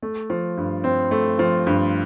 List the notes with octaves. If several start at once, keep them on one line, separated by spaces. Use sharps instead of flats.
A3
F3
G2
C4
A3
F3
G2